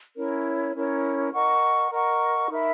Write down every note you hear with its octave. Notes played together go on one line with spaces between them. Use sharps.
C#4 E4 A#4 C#5
C#4 E4 A#4 C#5
A#4 D#5 F#5 C#6
A#4 D#5 F#5 C#6
D#4 A#4 E5 B5